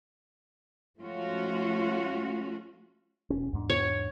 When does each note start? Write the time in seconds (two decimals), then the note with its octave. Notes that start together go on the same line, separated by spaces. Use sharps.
0.98 F3 G#3 A3 C#4 F4 F#4
3.30 E1 C#4
3.53 E2 G#2 D4
3.70 C#5